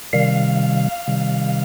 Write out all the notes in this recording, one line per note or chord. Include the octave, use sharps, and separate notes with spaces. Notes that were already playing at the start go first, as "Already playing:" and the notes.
C3 D#3 G3 F5
C3 D#3 G3